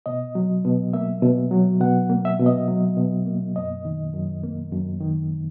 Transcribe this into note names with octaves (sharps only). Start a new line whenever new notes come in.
B2 D#5
F#3
B2
A#3 E5
B2
F#3
B2 F#5
A#3
E5
B2
D#5
F#3
B2
A#3
F#2 D#5
D#3
F#2
A#3
F#2
D#3